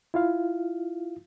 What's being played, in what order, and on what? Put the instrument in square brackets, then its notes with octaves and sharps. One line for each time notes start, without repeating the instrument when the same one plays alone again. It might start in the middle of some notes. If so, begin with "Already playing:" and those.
[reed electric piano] E4 F4 F5